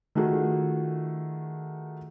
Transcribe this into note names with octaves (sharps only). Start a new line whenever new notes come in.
D#3 A3 F4 F#4 G#4